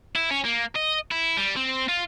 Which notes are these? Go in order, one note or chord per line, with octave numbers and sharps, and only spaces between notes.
E4
C#4
A#3
D#5
E4
G3
C4
F4